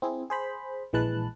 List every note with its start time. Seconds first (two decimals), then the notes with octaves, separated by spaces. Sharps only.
0.02 C4 E4 G#4
0.30 G#4 C5 B5
0.93 A#1 E3 G#3 B4 A5 F#6